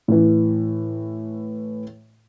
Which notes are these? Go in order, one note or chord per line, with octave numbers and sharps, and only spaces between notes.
A2 E3